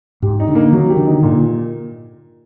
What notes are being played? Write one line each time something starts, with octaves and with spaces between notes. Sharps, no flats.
G#2 G4
D#4
D3
A#3
D#3 F#3
G4
D3
D#4
A#2 D3